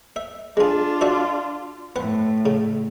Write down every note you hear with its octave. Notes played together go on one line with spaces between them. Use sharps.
E5
G#3 D4 F4 G#4
F#4 D5 E5
A2 B3 F#5
C#3